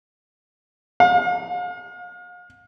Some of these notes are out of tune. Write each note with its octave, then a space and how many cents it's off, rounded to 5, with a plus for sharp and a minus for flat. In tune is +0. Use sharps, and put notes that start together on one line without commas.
F5 +40